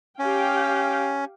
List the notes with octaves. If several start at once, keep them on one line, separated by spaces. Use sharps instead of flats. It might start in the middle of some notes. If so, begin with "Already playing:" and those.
C#4 G4 F5 G5